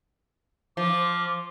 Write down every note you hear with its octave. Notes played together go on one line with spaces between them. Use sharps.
F3 D6